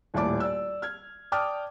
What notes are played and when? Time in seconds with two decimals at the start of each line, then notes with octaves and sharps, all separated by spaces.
0.14 D#1 D#2 A2 D5 A5 D6
0.40 D5 E6
0.82 F6 G#6
1.32 D5 G5 A5 D6 D#6 F6